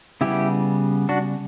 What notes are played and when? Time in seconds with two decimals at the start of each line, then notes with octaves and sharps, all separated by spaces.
0.21 C#3 G3 B3 E4 G4
1.09 D4 F#4